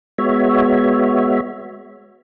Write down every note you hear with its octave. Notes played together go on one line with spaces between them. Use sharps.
G#3 B3 F#4 C#5 E5